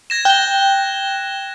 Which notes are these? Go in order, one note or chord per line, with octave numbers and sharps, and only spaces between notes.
G#6 A#6 E7
G5 F#6 G7